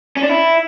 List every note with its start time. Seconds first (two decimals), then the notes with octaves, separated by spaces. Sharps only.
0.17 C#4
0.23 D4
0.30 E4